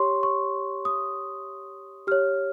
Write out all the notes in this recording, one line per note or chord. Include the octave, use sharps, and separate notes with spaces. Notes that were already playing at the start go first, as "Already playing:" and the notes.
Already playing: G4 C#5 C6 C#6
C#6
D#6
G4 C#5 F6